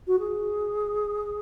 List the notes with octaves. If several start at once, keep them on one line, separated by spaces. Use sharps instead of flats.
F#4
G#4